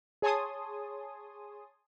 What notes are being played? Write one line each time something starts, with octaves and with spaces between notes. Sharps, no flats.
G#4 C#5 G#5 A5 C6 D#6